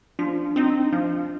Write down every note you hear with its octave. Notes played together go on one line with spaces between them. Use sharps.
F3 D4
C4 D#4
F3